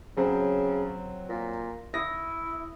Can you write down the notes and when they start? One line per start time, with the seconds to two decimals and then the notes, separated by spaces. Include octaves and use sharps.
0.17 C#3 F#3 C4
1.29 A#2
1.94 E4 D#6 A#6